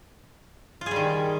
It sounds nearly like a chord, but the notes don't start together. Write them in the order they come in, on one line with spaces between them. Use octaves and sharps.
F4 G#4 G3 D#3